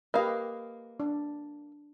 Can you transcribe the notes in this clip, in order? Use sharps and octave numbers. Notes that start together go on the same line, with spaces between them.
A#3 G4 B4 D#5 F5
D4